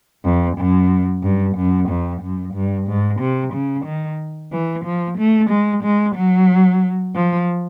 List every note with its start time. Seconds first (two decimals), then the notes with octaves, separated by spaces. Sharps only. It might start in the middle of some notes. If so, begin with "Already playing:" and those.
0.24 F2
0.57 F#2
1.23 G2
1.56 F#2
1.89 F2
2.21 F#2
2.54 G2
2.87 G#2
3.20 C3
3.53 C#3
3.85 D#3
4.52 E3
4.84 F3
5.18 A3
5.50 G#3
5.83 G#3
6.15 F#3
7.15 F3